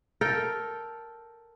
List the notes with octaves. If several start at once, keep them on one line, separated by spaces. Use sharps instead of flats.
A4 A#4 G5